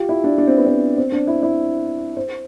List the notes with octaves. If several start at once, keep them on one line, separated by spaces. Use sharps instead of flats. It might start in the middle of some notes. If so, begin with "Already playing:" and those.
Already playing: F4 G4
E4
D4
D4
C4
B3
C4
C4
D4
E4
E4
C5